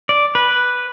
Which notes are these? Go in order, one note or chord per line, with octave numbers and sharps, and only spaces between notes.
D5
B4